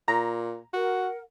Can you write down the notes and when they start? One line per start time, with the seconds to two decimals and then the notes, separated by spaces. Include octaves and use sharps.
0.08 A#2 A#5
0.73 F#4 A#4 F#5